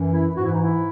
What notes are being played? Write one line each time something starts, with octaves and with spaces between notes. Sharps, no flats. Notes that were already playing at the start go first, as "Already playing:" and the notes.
Already playing: F#2 E3
E4
G#2 E3 F#4
E4
D#4
E4